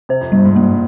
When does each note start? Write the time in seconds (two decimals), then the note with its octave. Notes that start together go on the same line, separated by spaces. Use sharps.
0.09 C3 C5
0.21 F2
0.32 G2 G3
0.45 G#2
0.56 G2 A#3